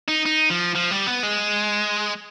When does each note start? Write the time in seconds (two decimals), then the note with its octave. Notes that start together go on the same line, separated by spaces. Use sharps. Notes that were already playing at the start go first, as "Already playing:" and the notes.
0.08 D#4
0.26 D#4
0.50 F3
0.75 F3
0.91 G3
1.07 B3
1.23 G#3